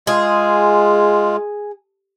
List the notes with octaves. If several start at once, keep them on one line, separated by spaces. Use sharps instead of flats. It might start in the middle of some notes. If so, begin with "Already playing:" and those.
G#3 F4 G#4